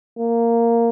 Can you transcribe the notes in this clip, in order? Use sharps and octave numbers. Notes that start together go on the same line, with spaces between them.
A#3